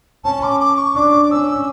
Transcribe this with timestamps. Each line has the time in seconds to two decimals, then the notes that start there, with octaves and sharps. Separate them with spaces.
0.24 C#4 A5
0.43 D6
0.60 D6
0.77 C#6
0.95 D4 D6
1.30 C#4 E6